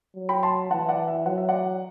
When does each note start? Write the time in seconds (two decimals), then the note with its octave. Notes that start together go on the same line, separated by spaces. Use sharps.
0.16 F#3
0.29 G5 B5
0.43 A5 C6
0.71 E3 F#5 A5
0.89 D5 F#5
1.08 E5
1.26 F#3 F#5
1.38 E5
1.49 D5 F#5